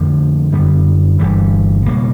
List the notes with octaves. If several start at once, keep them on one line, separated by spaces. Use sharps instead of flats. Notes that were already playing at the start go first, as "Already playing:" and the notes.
Already playing: F2 D3 F3 A3
F#2 D3 G3 B3
G1 G2 E3 G3
C#2 B2 G3 A#3